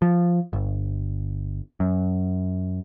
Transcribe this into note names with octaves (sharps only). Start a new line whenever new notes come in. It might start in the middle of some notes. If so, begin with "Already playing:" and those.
F3
G1
F#2